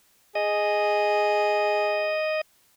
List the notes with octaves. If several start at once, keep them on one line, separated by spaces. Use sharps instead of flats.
G#4 D#5